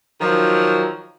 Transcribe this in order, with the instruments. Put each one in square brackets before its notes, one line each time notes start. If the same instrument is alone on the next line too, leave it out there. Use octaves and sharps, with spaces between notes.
[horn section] D#3 F3 F#3